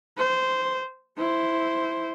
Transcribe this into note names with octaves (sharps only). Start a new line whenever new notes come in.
C5
E4 C5